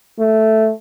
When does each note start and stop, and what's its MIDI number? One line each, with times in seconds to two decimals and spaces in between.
0.19 0.71 57